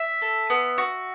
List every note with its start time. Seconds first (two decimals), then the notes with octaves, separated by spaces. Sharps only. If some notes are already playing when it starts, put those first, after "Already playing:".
Already playing: E5
0.22 A4
0.50 B3
0.78 F#4